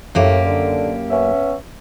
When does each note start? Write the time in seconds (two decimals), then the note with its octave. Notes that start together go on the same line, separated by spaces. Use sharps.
0.15 F#2 A2 A#3 G4
0.46 D3
1.10 B3 C#4 E5